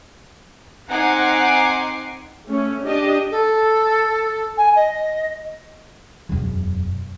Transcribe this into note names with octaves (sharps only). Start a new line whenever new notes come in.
C4 D#4 F#5 G#5 D6 C7
A3 C#4
D4 G4 D#5
A4
G#5
D#5
E1 F#2